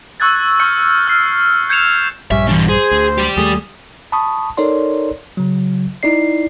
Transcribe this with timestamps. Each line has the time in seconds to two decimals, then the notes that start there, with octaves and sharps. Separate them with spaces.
0.20 C#6 E6 F#6 G#6 A6
0.60 C#6 F6 G6 C#7
1.07 F6 C7
1.69 G6 G#6 C#7 E7 F7
2.31 A#1 G2 G3 C#4 E5
2.48 E3 D4
2.69 G#4 C5
2.92 D2
3.18 G4 D5
3.37 D#2 G3 A3 G#4
4.12 A5 B5 C#6 D#6
4.57 D#4 A4 A#4 C#5 D5 C6
5.37 C#3 F#3
6.03 D#4 E4 D5 C7